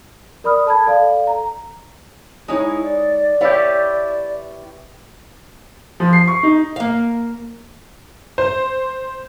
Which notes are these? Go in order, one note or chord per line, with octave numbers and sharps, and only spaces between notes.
A#4 D5 B5 D#6 F6
A4 A5 B5 G#6
A4 D5 F5
A#5
G#3 D#4 E4 C#5
D5
E4 G4 B4 C#5
F3
C7
C#6
D#4
A#3 F5
C5